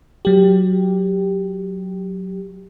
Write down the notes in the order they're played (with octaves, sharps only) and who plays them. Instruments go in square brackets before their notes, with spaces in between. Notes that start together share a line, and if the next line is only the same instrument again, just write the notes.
[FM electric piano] F#3 G4